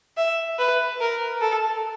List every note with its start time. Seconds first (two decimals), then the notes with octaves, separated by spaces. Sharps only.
0.17 E5
0.59 B4
1.01 A#4
1.41 A4